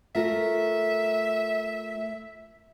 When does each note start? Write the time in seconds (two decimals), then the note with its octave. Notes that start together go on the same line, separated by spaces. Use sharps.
0.15 A3 F4 A#4 E5